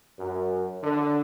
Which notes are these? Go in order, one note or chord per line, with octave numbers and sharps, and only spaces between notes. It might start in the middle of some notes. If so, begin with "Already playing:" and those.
F#2
D3